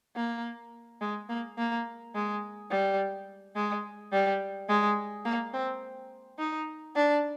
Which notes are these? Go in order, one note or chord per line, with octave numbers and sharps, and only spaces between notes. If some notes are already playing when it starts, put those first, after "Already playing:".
A#3
G#3
A#3
A#3
G#3
G3
G#3
G3
G#3
A#3
C4
D#4
D4